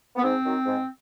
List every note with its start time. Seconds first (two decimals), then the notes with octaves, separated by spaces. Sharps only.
0.16 B3
0.21 G#2 C4
0.44 D#3 F#3
0.66 G#2